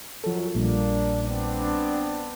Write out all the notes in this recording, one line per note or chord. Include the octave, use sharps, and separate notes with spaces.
F#2 F3 A4
A#1 A#2 G3 A#3 D4
B3 C4 D4